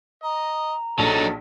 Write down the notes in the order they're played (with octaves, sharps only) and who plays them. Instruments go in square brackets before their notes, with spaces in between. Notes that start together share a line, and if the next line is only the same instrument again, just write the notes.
[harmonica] D#5 [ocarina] A#5
[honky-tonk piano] A#1 [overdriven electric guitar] F#3 D#4 [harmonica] A4 A5